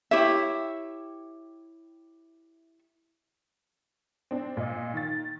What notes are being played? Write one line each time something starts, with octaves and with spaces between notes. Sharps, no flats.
E4 G4 C#5 E5
C4 D4
A#2 D#5
D#3 A6